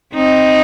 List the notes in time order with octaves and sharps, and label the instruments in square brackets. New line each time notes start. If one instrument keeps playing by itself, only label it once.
[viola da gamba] C4 D#4